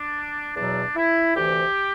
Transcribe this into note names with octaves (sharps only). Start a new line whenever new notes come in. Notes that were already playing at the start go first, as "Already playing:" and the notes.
Already playing: D4
E2 B2 F#3 D4
E4
D2 C3 E3 G4